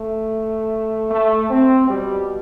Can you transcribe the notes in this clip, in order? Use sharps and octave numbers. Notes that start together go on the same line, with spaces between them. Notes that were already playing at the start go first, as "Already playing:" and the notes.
Already playing: A3
A3
C4
B2 G3